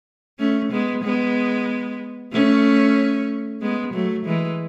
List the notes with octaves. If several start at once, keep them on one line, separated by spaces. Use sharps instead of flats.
A3 C#4
G#3 B3
G#3 B3
A3 C#4
G#3 B3
F#3 A3
E3 G#3